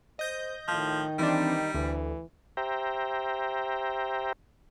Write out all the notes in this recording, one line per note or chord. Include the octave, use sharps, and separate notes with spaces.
C5 D#5 G6 A#6
A2 D#3 F3
E3 G3 C4 D4 D#4
D2 E3
G4 C5 E5 G5 A#5